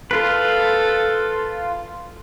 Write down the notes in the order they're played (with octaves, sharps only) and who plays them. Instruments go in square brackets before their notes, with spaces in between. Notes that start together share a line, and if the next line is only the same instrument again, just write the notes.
[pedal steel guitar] F4 B4 [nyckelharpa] A4